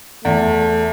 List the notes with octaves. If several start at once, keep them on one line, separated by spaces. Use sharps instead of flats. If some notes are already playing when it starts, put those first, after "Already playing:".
E2 A3